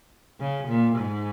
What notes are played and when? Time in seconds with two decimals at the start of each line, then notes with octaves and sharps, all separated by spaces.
0.40 C#3
0.68 A#2
0.96 G#2